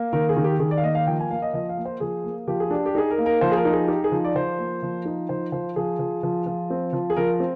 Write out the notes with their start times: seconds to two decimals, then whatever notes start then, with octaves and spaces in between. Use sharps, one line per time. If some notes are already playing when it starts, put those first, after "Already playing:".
Already playing: A#3
0.13 D#3 A#4
0.29 G#4
0.36 D#3
0.44 G4
0.59 D#3 G#4
0.71 D5
0.77 F5
0.83 A#3 D#5
0.95 F5
1.07 F3 G5
1.19 G#5
1.30 A#3 F5
1.42 D#5
1.54 F3 D#5
1.69 F5
1.77 A#3
1.85 C5
2.00 F3 G#4
2.24 A#3
2.48 F3 G4
2.60 G#4
2.71 D4 G4
2.86 G4
2.95 D#4 G#4
3.10 A#4
3.18 A#3
3.26 A#4
3.41 F3 C5
3.51 G#4
3.57 A#4
3.65 D#4
3.73 G#4
3.88 D#4 G4
4.04 G#4
4.12 F3
4.25 D5
4.35 F3 C5
4.58 A#3
4.83 F3
5.05 D#4
5.29 F3 C5
5.52 F3 C5
5.76 F3 G#4
5.99 F3
6.23 F3
6.46 F3
6.70 C4
6.93 F3
7.10 G#4
7.16 F3 A#4
7.40 C4